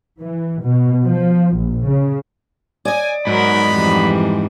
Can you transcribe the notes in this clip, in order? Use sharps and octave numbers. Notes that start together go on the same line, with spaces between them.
E3
B2
F3
A#1
C#3
D5 D#5 G#5
G#2 F#3 B3 D#4 A#4 B5
F2 E3 G3